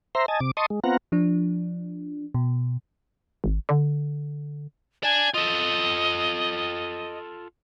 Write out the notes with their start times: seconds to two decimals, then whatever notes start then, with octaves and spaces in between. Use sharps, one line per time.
0.15 C5 E5 A#5 C6
0.28 D#5 G#5 A5
0.40 C3 D6
0.57 D#5 A5 C6 C#6 D#6
0.70 G#3
0.84 B3 C4 F4 F#5 A#5
1.12 F3 D4
2.34 B2
3.44 G#1
3.69 D3
5.03 D5 G#5 A5
5.34 F4 A4 D#5